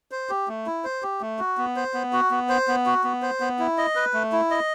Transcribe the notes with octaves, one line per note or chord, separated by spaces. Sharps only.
C5
G4
A3
E4
C5
G4
A3
F#4
B3
C5
B3
F#4
B3
C5
B3
F#4
B3
C5
B3
E4
D#5
B4
A3
E4
D#5